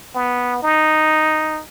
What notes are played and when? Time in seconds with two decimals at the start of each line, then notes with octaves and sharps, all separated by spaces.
0.15 B3
0.63 D#4